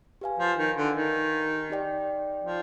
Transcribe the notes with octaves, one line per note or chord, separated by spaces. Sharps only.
G4 B4 F5 G#5
F3
D#3
D3
D#3
D#4 G4 D5 G5
F3